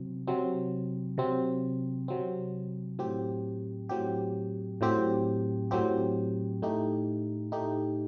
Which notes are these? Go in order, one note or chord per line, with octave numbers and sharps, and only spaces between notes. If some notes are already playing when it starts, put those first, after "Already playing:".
Already playing: C3 F#3 C4
C3 F#3 C4
C3 F#3 C4
C3 F#3 C4
A2 F#3 C4 G4
A2 F#3 C4 G4
A2 F#3 C4 G4
A2 F#3 C4 G4
A2 A3 D#4 G4
A2 A3 D#4 G4